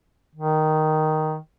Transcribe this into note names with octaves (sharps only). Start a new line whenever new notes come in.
D#3